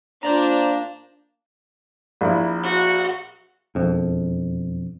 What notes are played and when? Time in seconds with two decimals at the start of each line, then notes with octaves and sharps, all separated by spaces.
0.23 A#2 D4 C5 D5 A#5
2.21 A#1 E4
2.64 F#4
3.75 E1 F2